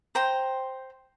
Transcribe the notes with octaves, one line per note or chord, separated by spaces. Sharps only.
C5 G5 A#5